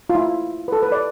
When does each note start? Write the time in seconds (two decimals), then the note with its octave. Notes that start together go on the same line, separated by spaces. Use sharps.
0.10 F4
0.15 E4
0.68 B4
0.72 A4
0.83 B4
0.92 D5